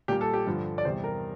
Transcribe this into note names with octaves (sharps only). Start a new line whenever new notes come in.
A#2 G3 A#3 G4
A4
G4
G2 D3 F3
D5
E2 C3 G3 C5
A#4